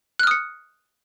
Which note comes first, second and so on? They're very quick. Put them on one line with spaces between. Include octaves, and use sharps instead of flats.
F#6 F6 D#6 C#7